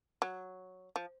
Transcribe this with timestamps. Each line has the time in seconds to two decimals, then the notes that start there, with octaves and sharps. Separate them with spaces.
0.22 F#3
0.96 F3